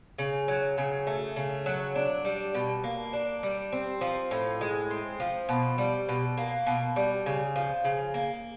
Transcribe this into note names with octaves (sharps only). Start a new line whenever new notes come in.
C#3
F#3
C#3
A3
C#3
F#3
D4
G3
B2
A#3
D4
G3
C4
F3
A2
G#3
C4
F3
B2
G3
B2
A#3
B2
G3
C#3
F3
C#3
A#3